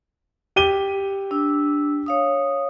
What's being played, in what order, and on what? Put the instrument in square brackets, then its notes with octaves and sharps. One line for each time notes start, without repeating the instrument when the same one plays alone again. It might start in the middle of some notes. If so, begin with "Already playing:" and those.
[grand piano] G4 D#7 G7
[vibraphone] D4 E6
C#5 F5 D#6